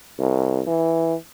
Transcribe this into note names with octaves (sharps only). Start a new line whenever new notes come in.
C2
E3